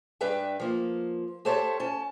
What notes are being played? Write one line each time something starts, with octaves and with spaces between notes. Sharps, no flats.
G2 D4 B4 E5 G5
F3 A#3
G4 A4 C5 C#5 E5 A5
C#4 A5